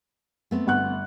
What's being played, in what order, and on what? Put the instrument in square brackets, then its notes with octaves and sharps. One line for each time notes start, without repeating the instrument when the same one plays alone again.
[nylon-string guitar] A3 B3 C4
[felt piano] G1 F#5 F#6